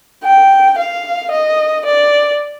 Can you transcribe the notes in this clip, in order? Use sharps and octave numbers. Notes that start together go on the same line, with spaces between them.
G5
F5
D#5
D5